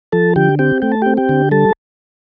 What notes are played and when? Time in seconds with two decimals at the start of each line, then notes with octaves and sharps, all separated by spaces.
0.12 F3 A4 A5
0.36 D3 G4 G5
0.59 C4 G4 G5
0.82 A3 G5
0.92 A5
1.02 C4 G4 G5
1.17 G4 G5
1.29 D3
1.51 G3 A4 A5